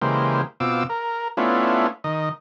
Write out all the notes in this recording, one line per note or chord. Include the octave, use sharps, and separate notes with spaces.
C#3 E3 G#3 A#3 G4 C5
B2 C4 F4 D6 E6
A#4
A3 B3 C#4 D4 E4 F4
D#3 D#5